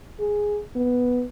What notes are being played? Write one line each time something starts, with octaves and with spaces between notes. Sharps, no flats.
G#4
B3